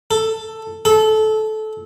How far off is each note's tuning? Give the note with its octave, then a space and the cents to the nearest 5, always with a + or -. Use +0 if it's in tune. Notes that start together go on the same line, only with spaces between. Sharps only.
A4 +10
A4 -20